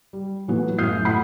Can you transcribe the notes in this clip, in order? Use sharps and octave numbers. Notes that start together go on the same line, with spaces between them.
G3
A2 E3 F#3 B3
F#2 A2 D#6 F6 G6 C7
A2 F#5 B5 D#6 C7